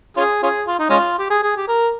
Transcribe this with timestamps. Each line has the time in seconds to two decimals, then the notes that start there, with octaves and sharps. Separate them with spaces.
0.17 C#4 F4 G#4
0.43 C#4 F4 G#4
0.67 F4
0.79 D#4
0.90 G#3 C#4 F4
1.19 G4
1.30 G#4
1.43 G#4
1.56 G4
1.68 A#4